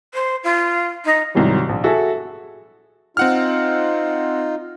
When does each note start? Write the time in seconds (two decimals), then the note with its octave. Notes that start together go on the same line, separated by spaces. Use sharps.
0.14 C5
0.44 F4
1.05 D#4
1.35 C2 G#2 D#3 F#3 G3
1.69 A#1
1.84 F#4 G#4 A4 E5 F#5
3.17 C4 D#4 F4 F#5 F6